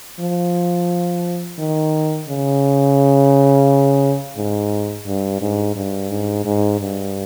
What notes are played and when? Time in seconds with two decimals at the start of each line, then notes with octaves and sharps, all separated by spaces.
0.20 F3
1.59 D#3
2.28 C#3
4.37 G#2
5.06 G2
5.41 G#2
5.76 G2
6.10 G#2
6.45 G#2
6.81 G2